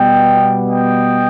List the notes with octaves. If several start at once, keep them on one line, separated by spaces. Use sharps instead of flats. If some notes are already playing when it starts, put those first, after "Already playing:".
Already playing: B2 G3 B3 D#5 G5
D#5 G5